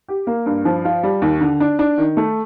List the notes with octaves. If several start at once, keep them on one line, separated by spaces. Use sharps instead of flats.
G4
A#3
G2
F3
F4
G3
D#2
D3
D4
D4
D#3
A3